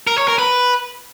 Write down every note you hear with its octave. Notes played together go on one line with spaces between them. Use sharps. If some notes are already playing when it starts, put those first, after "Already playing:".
A#4
C#5
A#4
B4